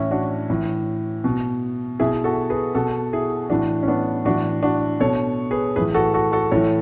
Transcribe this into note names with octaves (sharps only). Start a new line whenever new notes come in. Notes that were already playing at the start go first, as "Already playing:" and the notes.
Already playing: A2 E3 C#4 E4
D4 F#4
A2 E3
B2
B2 E4 G#4
F#4 A4
G#4 B4
B2 F#4 A4
E4 G#4
A2 E3 D4 F#4
C#4
B3 D4
A2 E3 D4 F#4
D4 F#4
B2 A4 C#5
G#4 B4
A2 E3 G#4 B4
F#4 A4
F#4 A4
F#4 A4
A2 E3 A4 C#5